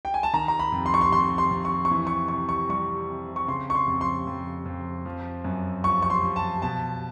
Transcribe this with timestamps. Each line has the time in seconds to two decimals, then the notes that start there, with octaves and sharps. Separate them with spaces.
0.05 G5
0.14 G#5
0.23 A5
0.33 D#3 A#5
0.48 A#5
0.59 B5
0.72 F2
0.86 C6
0.94 C#6
1.01 C6
1.12 F2 C6
1.38 C6
1.51 F2
1.65 C#6
1.85 C#6
1.91 E3
2.07 C#6
2.28 C3 C#6
2.49 C#6
2.69 G3 C#6
3.09 C3
3.36 C#6
3.48 C#3 C6
3.70 C#6
3.75 C6
3.88 F2
4.01 C6
4.27 F2
4.65 F2
5.05 F3
5.44 F#2
5.84 F3 C#6
6.02 C#6
6.10 C6
6.23 F3
6.36 A5
6.62 B2 A5